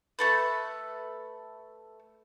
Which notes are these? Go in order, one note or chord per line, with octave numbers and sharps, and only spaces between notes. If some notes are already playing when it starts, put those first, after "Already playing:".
A3 A4 B4